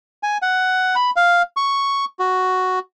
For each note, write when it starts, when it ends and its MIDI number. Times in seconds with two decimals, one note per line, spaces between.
0.23 0.37 80
0.42 0.95 78
0.96 1.10 83
1.16 1.42 77
1.57 2.05 85
2.19 2.79 66